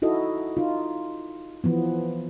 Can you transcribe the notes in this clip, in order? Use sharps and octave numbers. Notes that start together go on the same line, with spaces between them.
D#4 E4 F#4 A4 D#5
D#4 F4
E3 F3 B3